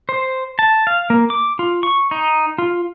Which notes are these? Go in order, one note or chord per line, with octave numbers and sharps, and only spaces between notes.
C5
A5
F5
A#3
D6
F4
C#6
D#4
F4